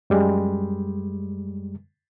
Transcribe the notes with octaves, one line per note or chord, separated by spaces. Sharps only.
F#2 G3 G#3